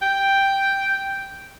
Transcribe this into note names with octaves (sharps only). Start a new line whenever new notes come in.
G5